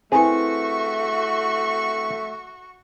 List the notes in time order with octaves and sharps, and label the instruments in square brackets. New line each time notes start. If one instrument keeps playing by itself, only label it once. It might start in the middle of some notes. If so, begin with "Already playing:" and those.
[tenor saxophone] A3 [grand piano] C4 E4 B4 [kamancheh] F#4 C#6 [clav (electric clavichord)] G#4